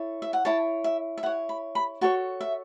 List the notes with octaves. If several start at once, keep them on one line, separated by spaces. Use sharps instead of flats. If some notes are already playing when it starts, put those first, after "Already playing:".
Already playing: E4 A4 C#5
E5
F#5
E4 C#5 A5
E5
E5
E4 C#5 F#5
B5
B5
F#4 A4 C#5 C#6
E5